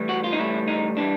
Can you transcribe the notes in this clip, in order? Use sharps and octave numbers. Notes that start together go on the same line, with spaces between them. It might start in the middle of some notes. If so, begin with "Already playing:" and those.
Already playing: A2 E3 G3
F#4
F4
D#4
A2 E3 G3 E4
D#4
E3 G3 D4